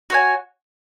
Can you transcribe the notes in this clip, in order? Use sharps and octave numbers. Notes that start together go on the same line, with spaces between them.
F#4 C#5 G#5